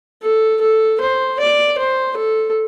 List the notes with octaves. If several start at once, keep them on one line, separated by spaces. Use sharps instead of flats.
A4
A4
C5
D5
C5
A4